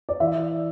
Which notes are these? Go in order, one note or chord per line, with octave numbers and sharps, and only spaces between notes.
D5
E3 E5